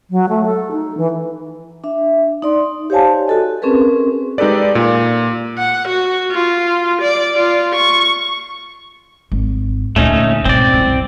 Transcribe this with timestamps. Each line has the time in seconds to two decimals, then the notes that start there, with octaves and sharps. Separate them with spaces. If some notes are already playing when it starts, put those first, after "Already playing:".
0.11 F#3
0.29 A3
0.46 A4
0.72 D#4
0.97 E3
1.84 D4 E5
2.42 D#4 D5 C6
2.90 G4 C5 C#5 F5 G#5 A5
3.27 F#4 A4 D#5
3.62 C4 C#4 G#4 A#4 B4
4.38 G#3 D#4 G4 A4 B4 D5
4.75 A#2
5.58 F#5
5.88 F#4
6.32 F4
7.02 D5
7.35 F4
7.76 C#6
9.32 G#1
9.96 D2 A#2 A3 C#4 D#4
10.45 G#2 B2 C4 D5
10.73 C2 F#2